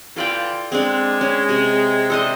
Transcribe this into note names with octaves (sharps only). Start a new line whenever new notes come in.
E3 F4 A4 D5 G5
G#3 C4 D4
C#4
C3
G#3 D4 E4 A4 C5 D#5